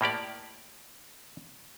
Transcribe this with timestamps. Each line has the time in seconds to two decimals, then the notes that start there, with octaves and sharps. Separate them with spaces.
0.01 A2 A#3 G4 D5